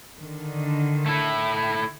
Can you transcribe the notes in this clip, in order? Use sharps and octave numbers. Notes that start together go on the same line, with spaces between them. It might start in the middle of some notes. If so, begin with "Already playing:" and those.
D3 D#3
A3 E4